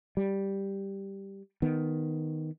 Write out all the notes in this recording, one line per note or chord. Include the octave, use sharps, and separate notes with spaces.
G3
D#3 B3